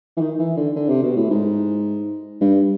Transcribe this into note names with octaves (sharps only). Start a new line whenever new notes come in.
E3
D#3
E3
D3
D3
C3
B2
A2
G#2
G2